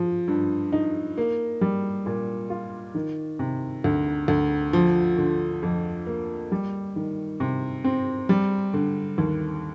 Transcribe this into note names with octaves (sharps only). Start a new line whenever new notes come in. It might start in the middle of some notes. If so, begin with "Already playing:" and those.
Already playing: F3
G2
D#4
A#3
G3
A#2
F4
D#3
C3
D2
D2
F3
D3
F2
A#3
G3
D#3
C3
C4
G3
D3
D#2